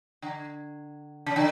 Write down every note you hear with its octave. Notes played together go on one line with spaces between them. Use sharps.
D3
C#3
D3